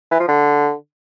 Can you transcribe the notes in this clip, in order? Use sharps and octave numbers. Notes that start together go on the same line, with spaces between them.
E3
F3
D3